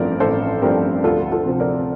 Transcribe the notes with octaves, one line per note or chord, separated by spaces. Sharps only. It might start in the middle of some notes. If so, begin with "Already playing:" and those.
Already playing: A1 G2 F3 A3 C4 A#4 D5
A1 A4 C5
G2 F3 A3 C4 G4 A#4
D2 F4 A4
F4 A4
C3 F3 C4
A#4 D5